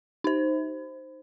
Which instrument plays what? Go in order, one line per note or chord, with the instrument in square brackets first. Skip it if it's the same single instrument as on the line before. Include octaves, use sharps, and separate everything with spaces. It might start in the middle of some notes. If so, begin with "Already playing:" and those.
[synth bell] D#4 C5